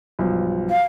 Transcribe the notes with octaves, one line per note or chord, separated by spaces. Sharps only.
B1 G2 F3
F5